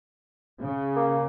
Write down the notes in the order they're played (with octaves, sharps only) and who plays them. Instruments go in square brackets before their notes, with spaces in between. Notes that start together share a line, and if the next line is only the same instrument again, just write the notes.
[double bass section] C#3
[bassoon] A#3